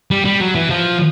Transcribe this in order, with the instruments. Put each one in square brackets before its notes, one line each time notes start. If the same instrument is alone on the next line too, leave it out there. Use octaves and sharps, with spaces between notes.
[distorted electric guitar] G3
G3
F#3
E3
F3